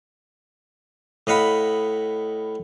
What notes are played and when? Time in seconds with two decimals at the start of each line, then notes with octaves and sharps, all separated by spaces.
1.27 A2 D#5 F5 F#5 B5